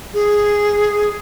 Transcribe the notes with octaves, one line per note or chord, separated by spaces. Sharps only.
G#4